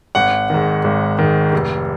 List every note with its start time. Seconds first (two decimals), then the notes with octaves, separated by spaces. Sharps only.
0.15 G#1 F#5
0.50 G#2 D#3
0.84 G#1
1.19 G#2 D#3
1.53 F1